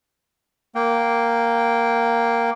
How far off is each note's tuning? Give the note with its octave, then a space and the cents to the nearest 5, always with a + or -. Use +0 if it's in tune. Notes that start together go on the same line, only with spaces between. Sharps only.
A#3 +0 G5 -15